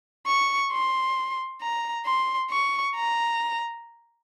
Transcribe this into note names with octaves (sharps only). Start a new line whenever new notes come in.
C#6
C6
A#5
C6
C#6
A#5